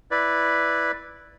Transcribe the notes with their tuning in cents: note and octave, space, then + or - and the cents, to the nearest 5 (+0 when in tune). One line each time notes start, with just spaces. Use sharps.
E4 +0 B4 +0 D5 +0